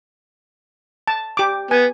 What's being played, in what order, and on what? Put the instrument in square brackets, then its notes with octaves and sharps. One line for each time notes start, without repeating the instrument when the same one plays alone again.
[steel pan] A5
G4 D6
[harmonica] B3 [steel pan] G#5